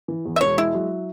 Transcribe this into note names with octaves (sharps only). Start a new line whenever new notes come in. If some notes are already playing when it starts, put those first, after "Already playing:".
E3
E2
E5
E1 C#5
G#3 E4
F#3